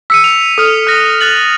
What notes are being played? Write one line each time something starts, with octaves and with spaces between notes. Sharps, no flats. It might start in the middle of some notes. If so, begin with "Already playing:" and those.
E6 B6 C#7 D#7
F7
A4 D#6 F6
F6 F#6 A#6
F#6 A6 F#7